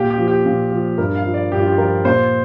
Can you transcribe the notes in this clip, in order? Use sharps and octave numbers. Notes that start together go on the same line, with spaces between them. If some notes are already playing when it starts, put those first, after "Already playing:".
Already playing: A#2 G4
G4
F3
G4
A#2
F3
G2 A#4
F5
F3
D5
G2 G4
F4
G4
F3 A#4
A#2 C5